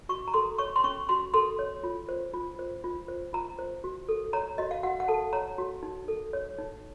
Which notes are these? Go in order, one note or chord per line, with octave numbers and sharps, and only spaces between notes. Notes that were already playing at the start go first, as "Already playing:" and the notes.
F#4 C#6
A#5
A4 C6
C#5 C#6
C6
C#4 C#6
F#4 C6
A4 C6
C#5
F4
C5
F4
C5
F4
C5
F4 A#5
C5
F#4
A4
C#5 A#5
F#4 D#5
F5
F#4 F#5
F#5
A4 A5
C#5 A#5
F#4
D#4
A4
C#5
D#4